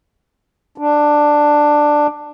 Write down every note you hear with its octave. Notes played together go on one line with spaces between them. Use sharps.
D4